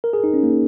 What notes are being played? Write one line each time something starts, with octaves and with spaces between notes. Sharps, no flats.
A#4
G#4
D#4
C#4
A#3